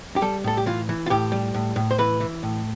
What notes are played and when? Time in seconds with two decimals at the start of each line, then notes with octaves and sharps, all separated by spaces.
0.16 G4
0.22 G3 A4
0.44 A2 A4
0.57 G4
0.66 E3 F4
0.89 E3
1.06 F4
1.10 A2 G4
1.32 G3
1.54 A2
1.76 A2
1.91 C5
1.98 E3 B4
2.20 E3
2.43 A2